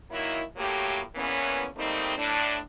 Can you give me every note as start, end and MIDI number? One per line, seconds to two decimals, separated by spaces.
0.11 0.41 51
0.11 0.41 54
0.11 0.41 58
0.11 0.41 64
0.57 1.00 45
0.57 1.00 54
0.57 1.00 57
0.57 1.00 58
0.57 1.00 67
1.15 1.65 40
1.15 1.65 52
1.15 1.65 58
1.15 1.65 59
1.15 1.65 61
1.76 2.15 55
1.76 2.15 57
1.76 2.15 58
1.76 2.15 60
1.76 2.15 63
2.17 2.57 45
2.17 2.57 62